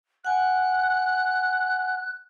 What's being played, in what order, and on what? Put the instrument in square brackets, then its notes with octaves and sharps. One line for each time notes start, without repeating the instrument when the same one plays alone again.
[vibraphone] F#5 G#5 [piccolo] F#6